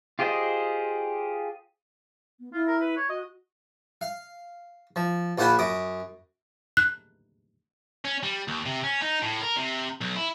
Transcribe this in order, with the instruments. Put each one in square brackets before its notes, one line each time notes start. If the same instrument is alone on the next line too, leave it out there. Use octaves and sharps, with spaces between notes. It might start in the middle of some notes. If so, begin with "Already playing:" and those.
[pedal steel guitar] F4 G4 G#4 C5 D#5
[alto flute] B3
[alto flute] E4 [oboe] F4
[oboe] A#4
B4
C#5
[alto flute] F#4 [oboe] D#5
[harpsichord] F5
F3
A#1 F4 C5 F#5 G#5 B5
F#2 D6 D#6
[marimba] F#6
[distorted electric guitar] C#4
G3
D#2
C3
C#4
D#4
A2
A#4
C3
B1
E4